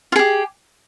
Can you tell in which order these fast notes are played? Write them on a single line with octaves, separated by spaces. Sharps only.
F4 G#4 G4